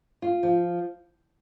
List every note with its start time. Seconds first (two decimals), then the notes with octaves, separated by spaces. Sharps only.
0.22 F4
0.43 F3